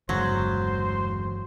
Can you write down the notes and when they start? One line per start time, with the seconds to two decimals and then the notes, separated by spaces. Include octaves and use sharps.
0.09 G1 E2 C#3 F#3 G#3 C5